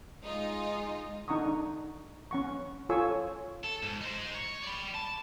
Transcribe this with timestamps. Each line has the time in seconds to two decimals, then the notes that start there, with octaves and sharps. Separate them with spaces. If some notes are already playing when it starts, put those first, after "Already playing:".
0.23 G#3 D#4 F4 D#5
1.28 D4 D#4 F#5 A#5 C#6 D#6
2.31 C#4 F#5 C#6
2.89 F4 A4 C#5 G#5 C#6 E6
3.64 A4
3.82 G#2
4.01 D#4 C5
4.35 C#5
4.63 D5 B5
4.95 A5